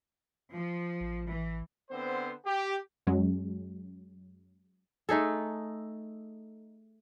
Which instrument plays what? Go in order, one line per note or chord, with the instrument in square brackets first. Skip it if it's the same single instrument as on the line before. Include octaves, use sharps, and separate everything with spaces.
[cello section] F3
[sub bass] A1
[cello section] E3
[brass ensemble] D3 B3 C4 C5
G4
[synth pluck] F#2 F#3 G#3 C#4
[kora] A3 D#4 G#4 A4